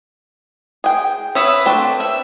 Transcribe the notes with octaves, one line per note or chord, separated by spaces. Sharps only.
G#4 G5
B4 C#5 E5 D#6
A3 C4 D4
E5